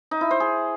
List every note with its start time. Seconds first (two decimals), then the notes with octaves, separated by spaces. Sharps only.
0.11 D#4
0.21 E4
0.31 C5
0.40 G#4